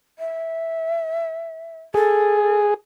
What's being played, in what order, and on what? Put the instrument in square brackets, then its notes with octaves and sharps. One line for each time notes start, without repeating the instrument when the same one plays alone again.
[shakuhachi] E5
[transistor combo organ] G#4 [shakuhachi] A4